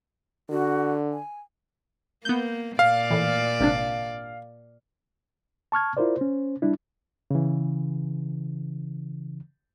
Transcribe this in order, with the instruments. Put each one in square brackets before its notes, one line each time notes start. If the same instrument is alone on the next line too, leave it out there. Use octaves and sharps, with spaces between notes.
[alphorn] D3 [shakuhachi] F#4
[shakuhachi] G#5
[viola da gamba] A#3 [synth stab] B3 G6
[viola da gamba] A#2 D5 [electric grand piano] F5
[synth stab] A2 E3
G#1 C3 D4
[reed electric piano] A5 C#6 F6 G#6
E4 F4 A#4 C5 D5
C#4 C5
G3 D4 E4
C#3 E3